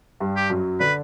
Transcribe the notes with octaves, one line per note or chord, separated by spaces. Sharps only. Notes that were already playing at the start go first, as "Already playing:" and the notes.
G2 G3
G4
F#2 F#3
D3 D4 B4